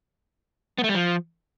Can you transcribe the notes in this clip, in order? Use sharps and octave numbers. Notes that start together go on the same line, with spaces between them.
B3
A3
G3
F3